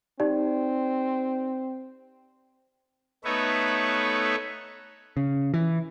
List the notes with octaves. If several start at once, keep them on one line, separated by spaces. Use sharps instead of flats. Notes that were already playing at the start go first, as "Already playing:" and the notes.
C4 D#4 G4 D5
A3 B3 D#4 B4 C#5 E5
C#3
E3